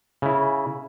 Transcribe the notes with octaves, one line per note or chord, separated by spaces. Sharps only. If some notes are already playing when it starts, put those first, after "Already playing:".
C#3 E4